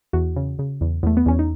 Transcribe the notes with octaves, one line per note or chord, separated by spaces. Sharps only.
E2 F#4
C#3
C#3
E2
E2 A3
B3
E2 C#4
D#4